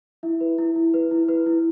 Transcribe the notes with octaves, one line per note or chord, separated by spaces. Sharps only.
E4 E5
B4
E4
E4
B4
E4
B4
E4